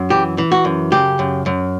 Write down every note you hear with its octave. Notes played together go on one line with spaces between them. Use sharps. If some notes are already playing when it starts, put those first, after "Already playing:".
Already playing: F#2
E3 G4
E3
F#4
F#2
C#3 G4
F#2
F#2